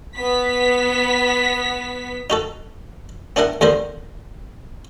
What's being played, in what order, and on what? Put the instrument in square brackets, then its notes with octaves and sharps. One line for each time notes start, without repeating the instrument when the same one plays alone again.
[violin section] B3 B6
[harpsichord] D#4 F#4 A4
B3 D4 E4 A#4 F#5
D#2 D3 B3 A#4 C5